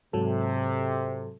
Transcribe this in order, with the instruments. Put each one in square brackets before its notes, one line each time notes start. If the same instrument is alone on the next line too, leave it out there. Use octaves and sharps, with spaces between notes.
[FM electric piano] G#2 F#3 A4 [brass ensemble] C3